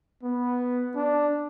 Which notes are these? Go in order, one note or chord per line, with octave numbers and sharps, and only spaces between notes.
B3
D4